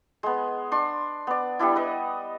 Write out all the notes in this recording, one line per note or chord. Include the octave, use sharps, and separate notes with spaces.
G#3 B3
D4 C6
B3 D5
G3 B3 D4 E4
B4 D#5